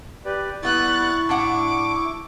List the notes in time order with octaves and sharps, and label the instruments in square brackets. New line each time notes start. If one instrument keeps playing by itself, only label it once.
[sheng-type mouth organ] G4 B4 D5
[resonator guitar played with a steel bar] G3 B3 [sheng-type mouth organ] E4 C#6 [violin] F#6 A6
[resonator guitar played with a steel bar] A2 D4 F#5 [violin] D6